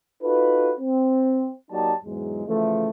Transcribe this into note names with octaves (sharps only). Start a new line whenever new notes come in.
D#4 F4 F#4 A4 B4
C4
F#3 A#3 D#4 G4 D5 A5
E2 G#2 F#3 G#3
C#3 E3 F3 A3